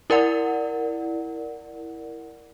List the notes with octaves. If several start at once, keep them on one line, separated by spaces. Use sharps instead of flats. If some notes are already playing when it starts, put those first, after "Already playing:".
E4 A#4 D5 F#5